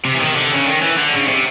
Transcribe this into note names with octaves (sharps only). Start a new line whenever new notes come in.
C3
E3
D#3
D3
C#3
D#3
E3
D3
C#3
C3